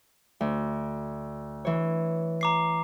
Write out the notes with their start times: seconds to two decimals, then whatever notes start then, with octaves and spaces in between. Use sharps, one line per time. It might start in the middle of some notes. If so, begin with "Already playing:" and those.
0.41 D2
1.65 E3 C#5
2.41 A#5 D6 C7